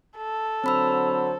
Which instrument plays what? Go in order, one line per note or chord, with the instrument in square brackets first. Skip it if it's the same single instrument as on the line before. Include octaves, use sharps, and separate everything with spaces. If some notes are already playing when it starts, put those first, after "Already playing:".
[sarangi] A4
[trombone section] D3 F#3 C5 [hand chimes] C4 B5 E6